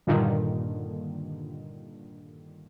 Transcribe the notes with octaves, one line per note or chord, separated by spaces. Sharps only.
G2 A#2 D3 D#3